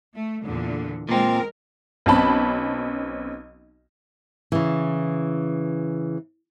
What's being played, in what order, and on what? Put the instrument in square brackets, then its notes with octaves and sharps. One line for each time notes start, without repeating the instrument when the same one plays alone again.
[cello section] A3
E2 A#2 D3
[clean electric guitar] A#2 C4 [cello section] G#3 A#4
[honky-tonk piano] B1 C4 C#4 A5 B5
[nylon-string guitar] C#3 E3